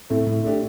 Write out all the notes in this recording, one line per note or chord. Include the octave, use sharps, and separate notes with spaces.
A2 A3 C4
A2
A3 D4 G4